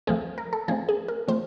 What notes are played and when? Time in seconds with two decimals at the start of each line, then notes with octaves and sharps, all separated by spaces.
0.07 F3 A3 C4 G#4
0.38 A#4
0.53 A4
0.68 F3 A3 C4 G#4
0.89 G#4
1.08 A#4
1.28 F3 A3 C4 C5